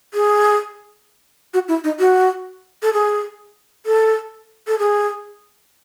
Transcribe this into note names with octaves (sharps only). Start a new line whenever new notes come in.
G#4
F#4
E4
D#4
F#4
A4
G#4
A4
A4
G#4